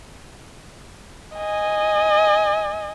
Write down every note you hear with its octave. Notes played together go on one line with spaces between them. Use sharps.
D#5 G#5